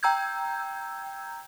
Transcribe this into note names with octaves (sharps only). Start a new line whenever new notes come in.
G5 A#5 E6 G6 G#6